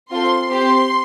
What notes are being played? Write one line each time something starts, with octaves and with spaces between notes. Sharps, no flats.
C4 F4 A4 C6
C4 G4 C6